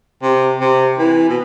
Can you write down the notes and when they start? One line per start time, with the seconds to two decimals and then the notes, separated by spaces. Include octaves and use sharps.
0.22 C3
0.60 C3
0.98 E3
1.29 B2